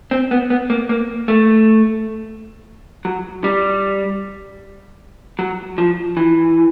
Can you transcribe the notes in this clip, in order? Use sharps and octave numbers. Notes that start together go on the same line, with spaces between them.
C4
B3
B3
A#3
A#3
A3
F#3
G3
F#3
F3
E3